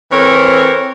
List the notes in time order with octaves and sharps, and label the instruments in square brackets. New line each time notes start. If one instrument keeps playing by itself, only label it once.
[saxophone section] E3 C4 A4 A#4 C5 C#5